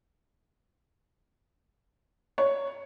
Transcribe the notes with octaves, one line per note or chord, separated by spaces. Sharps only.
C#5